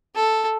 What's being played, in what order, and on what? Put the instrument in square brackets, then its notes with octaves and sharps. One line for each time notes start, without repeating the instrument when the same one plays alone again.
[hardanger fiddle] A4